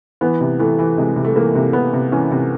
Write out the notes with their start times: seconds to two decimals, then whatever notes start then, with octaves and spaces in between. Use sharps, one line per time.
0.21 E3 B3
0.41 C3
0.59 E3 A3
0.79 E3
0.98 C3 G#3
1.16 C3
1.25 A3
1.35 E3 A#3
1.55 C3
1.73 C3 B3
1.93 C3
2.12 E3 C#4
2.32 C3